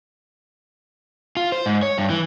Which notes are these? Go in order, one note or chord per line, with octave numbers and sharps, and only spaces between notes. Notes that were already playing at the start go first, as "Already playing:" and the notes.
F4
C5
G#2
C#5
G2
E3